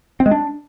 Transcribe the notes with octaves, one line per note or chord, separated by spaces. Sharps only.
C4
G#3
D4